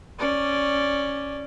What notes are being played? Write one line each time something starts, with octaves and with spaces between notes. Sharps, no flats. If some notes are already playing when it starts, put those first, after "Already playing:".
C#4 D5